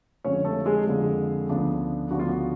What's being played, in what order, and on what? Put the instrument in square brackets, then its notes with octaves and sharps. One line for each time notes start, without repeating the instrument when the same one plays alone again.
[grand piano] F2 D3 F3 G#3 C#4 C#5
A3 A4
G#3 G#4
F2 D3 F3 G#3
D2 C#3 F3 B3 D4
D2 C#3 F3 B3 D4 F#4
F4
F#4